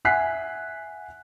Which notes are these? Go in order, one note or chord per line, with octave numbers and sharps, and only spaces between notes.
E5 F#5 G#5 F#6 B6 C7